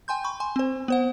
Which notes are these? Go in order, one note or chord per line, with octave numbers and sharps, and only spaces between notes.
G5 G#5 C6 G6
B5 C#6
G#5 C6
C4 C5
B3 C5 F#5